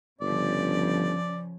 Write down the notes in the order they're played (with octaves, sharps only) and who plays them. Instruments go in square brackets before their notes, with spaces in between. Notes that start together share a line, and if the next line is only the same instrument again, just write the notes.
[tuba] G1 [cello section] C#3 F3 C#4 [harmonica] D5